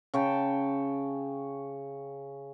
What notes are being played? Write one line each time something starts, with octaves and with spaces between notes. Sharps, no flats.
C#3 C#5 G5 A5